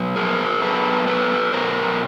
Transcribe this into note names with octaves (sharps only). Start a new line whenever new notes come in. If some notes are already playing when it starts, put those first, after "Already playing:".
Already playing: B2 F#3 B3
G#4 A#4
B2 F#3 B3 A4 B4
A4 B4
B2 F#3 B3 A#4 C5